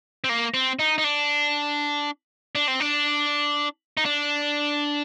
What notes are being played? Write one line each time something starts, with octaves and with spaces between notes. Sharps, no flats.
C4
A#3
C4
D#4
D#4
D4
D4
C4
D4
D#4
D4